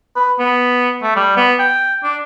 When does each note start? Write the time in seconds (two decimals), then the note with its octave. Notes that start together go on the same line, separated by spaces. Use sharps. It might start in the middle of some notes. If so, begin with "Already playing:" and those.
0.16 B4
0.40 B3
1.02 A3
1.16 G3
1.37 B3
1.59 G5
2.03 D4